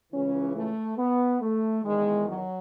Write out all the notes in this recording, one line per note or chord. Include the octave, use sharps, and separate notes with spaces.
C#2 C#3 E3 C#4
A3
B3
A3
E2 D#3 G#3
F#3